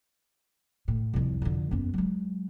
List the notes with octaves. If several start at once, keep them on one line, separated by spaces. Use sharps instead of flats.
A2
C2 F2
F2 D3
F#2 B3
F#3 G#3